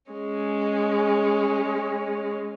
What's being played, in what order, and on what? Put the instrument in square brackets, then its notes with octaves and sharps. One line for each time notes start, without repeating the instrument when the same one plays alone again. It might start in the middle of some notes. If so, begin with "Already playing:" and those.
[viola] G#3 C#4